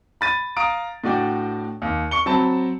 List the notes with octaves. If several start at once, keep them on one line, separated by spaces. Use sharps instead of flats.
B5 A6 D#7
F5 A#5 D#6 D7
A2 D4 F#4 D5 G5
D#2
C#6 C#7 G7
F#3 C4 A5 B5